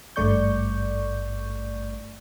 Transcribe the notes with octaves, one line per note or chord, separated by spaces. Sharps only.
G#1 G2 A3 D5 C#6 G6